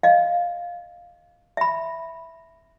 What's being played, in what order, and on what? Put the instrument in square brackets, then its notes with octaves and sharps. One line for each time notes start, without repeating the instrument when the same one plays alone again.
[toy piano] D#5 F5
E5 B5